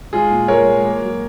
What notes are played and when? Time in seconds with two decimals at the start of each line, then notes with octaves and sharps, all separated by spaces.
0.13 G#3 F4 G#4
0.31 A#2
0.48 G#3 A#4 C#5
0.66 G#3
0.84 A#3
1.02 F#3